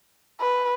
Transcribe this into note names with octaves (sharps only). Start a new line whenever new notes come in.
B4